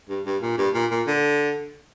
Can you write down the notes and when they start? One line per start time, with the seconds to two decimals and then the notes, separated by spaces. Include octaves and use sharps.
0.09 G2
0.26 G2
0.42 A#2
0.58 G2
0.74 A#2
0.91 A#2
1.07 D3